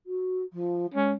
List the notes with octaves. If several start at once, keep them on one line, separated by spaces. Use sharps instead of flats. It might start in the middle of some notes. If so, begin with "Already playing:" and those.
F#4
F3
G#3 C#4